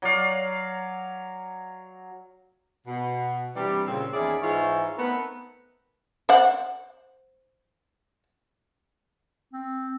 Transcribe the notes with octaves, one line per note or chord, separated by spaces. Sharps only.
F#3 D5 F5
B2
G2 C3 E3 G3
A#2 C#3 C4
E2 D#3 C#4 E4 G#4 D5
G#2 E3 D#4 F4 C#5 E5
A3 B3 C4 D#4 A#4 B4
C5 F#5
C4